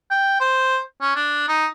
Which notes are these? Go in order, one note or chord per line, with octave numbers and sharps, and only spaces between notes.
G5
C5
C#4
D4
D#4